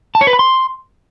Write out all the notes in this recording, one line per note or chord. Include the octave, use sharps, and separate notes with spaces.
A5
C#5
B4
B5
C6